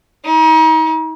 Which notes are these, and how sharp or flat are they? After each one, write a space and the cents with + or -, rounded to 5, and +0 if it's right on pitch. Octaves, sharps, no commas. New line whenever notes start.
D#4 +35